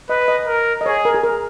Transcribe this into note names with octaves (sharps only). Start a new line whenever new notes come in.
B4 D#5
D#5
A#4
D#5
G#4 C#5
A#4
G#4
A#4